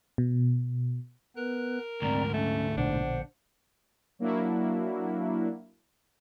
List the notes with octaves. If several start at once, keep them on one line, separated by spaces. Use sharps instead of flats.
B2
B3 A#4 B4 F#6
D2 G#2 C4 D5 A#5
A3 C#4
A#1 B2 D3 D4 C5 F#5
F#3 A#3 D4 E4 F#4